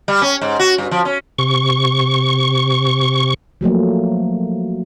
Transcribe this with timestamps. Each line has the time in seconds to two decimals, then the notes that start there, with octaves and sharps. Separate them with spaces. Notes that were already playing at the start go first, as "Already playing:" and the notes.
0.08 G3
0.22 C#4
0.41 G#2
0.59 F#4
0.78 G2
0.91 F3
1.05 C#4
1.38 C3 C#6
3.61 F3 F#3 A3 A#3